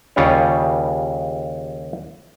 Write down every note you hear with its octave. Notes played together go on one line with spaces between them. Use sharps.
D#2 C#3 G3 F4 G4 C#5